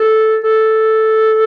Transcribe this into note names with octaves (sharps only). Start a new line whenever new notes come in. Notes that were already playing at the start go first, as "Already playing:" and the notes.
Already playing: A4
A4